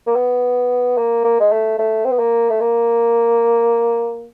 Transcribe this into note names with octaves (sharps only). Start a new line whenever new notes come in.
A#3
B3
A#3
A#3
G#3
A3
A3
C4
B3
A#3
A3
A#3